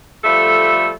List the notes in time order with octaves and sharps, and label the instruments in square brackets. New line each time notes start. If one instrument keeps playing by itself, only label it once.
[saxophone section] F3 G3 A3 A4